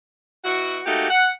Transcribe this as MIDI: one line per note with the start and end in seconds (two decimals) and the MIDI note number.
0.45 0.80 47
0.45 0.80 64
0.45 0.80 66
0.86 1.08 57
0.86 1.08 58
0.86 1.08 63
0.86 1.08 66
0.86 1.08 67
1.09 1.32 78